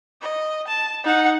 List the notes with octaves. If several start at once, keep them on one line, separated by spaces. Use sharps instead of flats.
D#5
A5
D#4 F#5